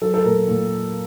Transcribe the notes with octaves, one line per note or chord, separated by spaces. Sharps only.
F#3 A4
A4
A#2 A#4
A#2